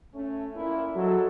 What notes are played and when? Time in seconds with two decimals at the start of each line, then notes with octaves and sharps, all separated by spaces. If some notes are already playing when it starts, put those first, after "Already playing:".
0.14 A3 C#4
0.55 A#2 A#3 E4
0.96 F#3 G#3 A4